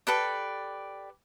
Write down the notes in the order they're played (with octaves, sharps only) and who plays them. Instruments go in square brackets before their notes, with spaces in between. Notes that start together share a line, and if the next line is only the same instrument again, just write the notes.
[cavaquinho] G4 A4 B4 D5